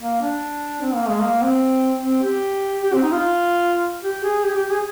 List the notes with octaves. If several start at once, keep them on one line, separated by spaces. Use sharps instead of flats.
A#3
D4
C4
A#3
G#3
A#3
C4
C4
G4
G4
C4
D#4
F4
G4
G#4
G4
G4
G#4